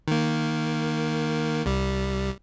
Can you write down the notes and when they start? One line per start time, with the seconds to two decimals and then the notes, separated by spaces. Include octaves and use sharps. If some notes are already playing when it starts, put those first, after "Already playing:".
0.08 D#3 A#3
1.66 C2 G3